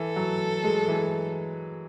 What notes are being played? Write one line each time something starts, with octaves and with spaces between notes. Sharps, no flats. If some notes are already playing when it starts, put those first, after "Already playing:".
Already playing: E3 A4
F#3
G#3
E3